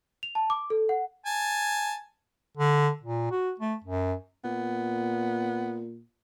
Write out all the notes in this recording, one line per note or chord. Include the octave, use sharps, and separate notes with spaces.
F7
A5
D6
A4
F#5
G#5 A5
D3
A#2
F#4
A3
F#2
A#2 B3